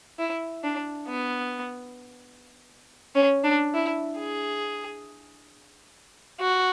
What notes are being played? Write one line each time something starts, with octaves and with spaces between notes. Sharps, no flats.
E4
D4
B3
C#4
D4
E4
G#4
F#4